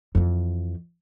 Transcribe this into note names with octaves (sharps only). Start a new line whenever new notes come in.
F2 E3